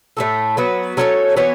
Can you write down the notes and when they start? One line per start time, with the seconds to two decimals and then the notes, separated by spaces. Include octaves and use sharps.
0.17 A2 A3 F#4 A4
0.57 F#3 B3 F#4
0.97 F#3 C#4 A4 C#5
1.36 E3 B3 F#4 C#5